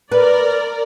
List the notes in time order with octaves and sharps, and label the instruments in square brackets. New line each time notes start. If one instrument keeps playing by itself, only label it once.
[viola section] A#4 D5 [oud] B4